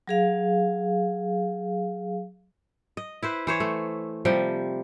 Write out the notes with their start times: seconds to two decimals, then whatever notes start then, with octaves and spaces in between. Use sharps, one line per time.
0.08 F#3 G#4 F5
2.97 D#5
3.23 E4 B4 C5
3.47 E3 C5 C#5
3.60 A3
4.25 C3 F3 G3 G5